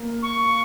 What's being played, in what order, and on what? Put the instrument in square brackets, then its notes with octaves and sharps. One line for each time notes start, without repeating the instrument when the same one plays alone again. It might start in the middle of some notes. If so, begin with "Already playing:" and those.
Already playing: [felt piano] A#3
[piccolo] C#6